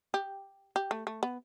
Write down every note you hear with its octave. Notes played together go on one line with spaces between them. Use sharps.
G4
G4
A3
A3
B3